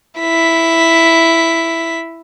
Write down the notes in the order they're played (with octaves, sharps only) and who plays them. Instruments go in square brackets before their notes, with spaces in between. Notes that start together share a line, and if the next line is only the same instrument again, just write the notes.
[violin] E4 B6